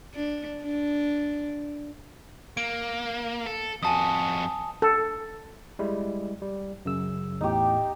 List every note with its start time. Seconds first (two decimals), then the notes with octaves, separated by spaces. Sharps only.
0.14 D4
0.64 D4
2.57 A#3 D7
3.46 A4
3.83 F2 F#4 G#5 A5 D#6
4.82 A4
5.79 G3 G#3 E4
6.42 G3
6.85 F#2 C#3 E6
7.41 E2 A2 D#4 G4